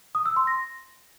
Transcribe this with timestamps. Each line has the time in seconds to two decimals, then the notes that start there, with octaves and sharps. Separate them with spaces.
0.15 D#6
0.26 E6
0.36 C6
0.47 A#6